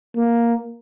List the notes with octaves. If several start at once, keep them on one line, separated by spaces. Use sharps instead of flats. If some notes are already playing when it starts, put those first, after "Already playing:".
A#3